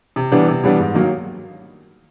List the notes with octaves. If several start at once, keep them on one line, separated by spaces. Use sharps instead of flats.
C3
E3 G3 B3 D4
C3
E3 G3 B3 D4
G#2
D#3 F#3 A#3